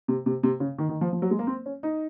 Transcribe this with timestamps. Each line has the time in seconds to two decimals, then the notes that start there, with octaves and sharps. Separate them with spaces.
0.08 C3
0.26 C3
0.43 C3
0.60 C#3
0.78 D#3
0.89 D#3
1.01 F3
1.13 F3
1.22 F#3
1.31 G#3
1.39 A#3
1.47 C4
1.66 C#4
1.83 D#4